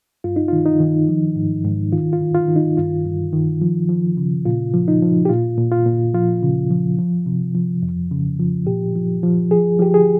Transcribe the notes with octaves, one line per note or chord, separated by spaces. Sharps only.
G2 F4
D#4
D#3 F4
D#4
D#3
F3
G#2
G#2
D#3 F4
F4
D#3
F4
D#3
D#4
G2 F4
G2
D#3
F3
F3
C#3
A#2 F4
F3
D#4
F3
G4
A#2 F4
A#2
F4
A#2
F3 F4
C#3
F3
F3
C3
F3
F2
C#3
F3
A#2 G4
F3
F3
F3 G#4
F3 G4
G#4